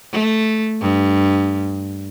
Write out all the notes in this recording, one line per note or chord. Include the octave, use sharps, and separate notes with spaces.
A3
G2